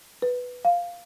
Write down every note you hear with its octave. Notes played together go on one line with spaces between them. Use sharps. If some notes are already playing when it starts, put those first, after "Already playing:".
B4
F5